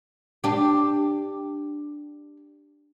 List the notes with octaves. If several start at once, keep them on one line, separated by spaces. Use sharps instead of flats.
D4 G4